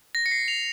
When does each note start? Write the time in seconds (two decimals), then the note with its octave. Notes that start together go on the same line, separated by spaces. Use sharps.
0.15 A#6
0.26 C#7
0.31 C7
0.48 F7